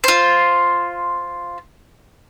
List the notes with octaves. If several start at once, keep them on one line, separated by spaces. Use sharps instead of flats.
F4 C5